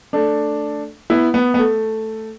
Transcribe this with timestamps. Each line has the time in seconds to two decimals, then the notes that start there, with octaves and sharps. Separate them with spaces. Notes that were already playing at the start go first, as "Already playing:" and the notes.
0.13 A3 D4
1.10 B3 E4
1.34 B3
1.54 B3
1.58 A3